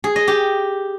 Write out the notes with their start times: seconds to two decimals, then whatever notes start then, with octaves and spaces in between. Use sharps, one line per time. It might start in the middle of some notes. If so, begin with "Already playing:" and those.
0.04 G#4
0.16 D#5
0.28 G4